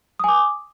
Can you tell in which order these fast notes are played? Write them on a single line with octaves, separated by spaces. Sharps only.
D#6 G#5 D6